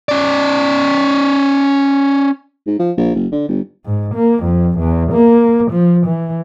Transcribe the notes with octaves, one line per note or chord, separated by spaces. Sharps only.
C#4 D5
G#2
F3
A#1
F#1
D3
G1
G#2
A#3
F2
E2
A#3
F3
E3